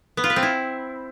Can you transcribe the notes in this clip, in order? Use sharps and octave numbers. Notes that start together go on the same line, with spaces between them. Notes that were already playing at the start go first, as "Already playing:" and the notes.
B3
F4
B4
C4
E4